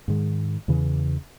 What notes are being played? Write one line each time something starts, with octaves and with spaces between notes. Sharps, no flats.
G#2 D#3 G#3
E2 C#3 E3